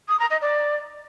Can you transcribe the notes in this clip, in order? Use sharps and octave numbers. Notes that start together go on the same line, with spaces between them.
D#6
A#5
D#5
D5